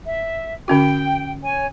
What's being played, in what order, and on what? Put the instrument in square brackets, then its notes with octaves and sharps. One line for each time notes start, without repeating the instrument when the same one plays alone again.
[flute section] E5
[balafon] D3 C#4 F#4 [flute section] G5
[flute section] C#5 G#5